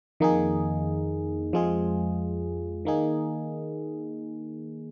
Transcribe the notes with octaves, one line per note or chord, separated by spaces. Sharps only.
F2 D#3 A#3 D#4 G#4
F2 F3 G#3 F4 G#4
D#3 A#3 D#4 G#4